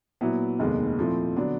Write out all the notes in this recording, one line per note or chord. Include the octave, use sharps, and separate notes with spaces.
A#2 F#3 B3 E4
F1 D#2 D#3 G#3 B3
A#2 F3 A3 C4 E4
D3 F#3 B3 D4